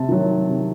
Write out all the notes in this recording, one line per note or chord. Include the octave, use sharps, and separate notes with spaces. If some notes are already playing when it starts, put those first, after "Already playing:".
Already playing: C3 A5
D#3 F#3
C3